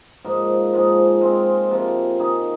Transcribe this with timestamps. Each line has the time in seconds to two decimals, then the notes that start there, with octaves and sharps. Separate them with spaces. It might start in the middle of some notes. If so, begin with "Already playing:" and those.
0.25 G#2 F3 A#3 D#4
0.73 G#2 F3 A#3 G#4
1.21 G#3 C4 F4
1.71 C3 F3 A#3
2.19 D#3 A#3 D#4 G#4